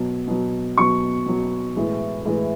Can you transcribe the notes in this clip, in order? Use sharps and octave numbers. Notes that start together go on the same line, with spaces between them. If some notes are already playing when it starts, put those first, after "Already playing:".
Already playing: B2 F#3
B2 F#3
B2 F#3 C#6
B2 F#3
A2 E3 G#3
A2 E3 G#3